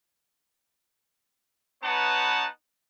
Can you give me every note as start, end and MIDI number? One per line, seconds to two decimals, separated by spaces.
1.84 2.46 59
1.84 2.46 63
1.84 2.46 71
1.84 2.46 73
1.84 2.46 78
1.84 2.46 81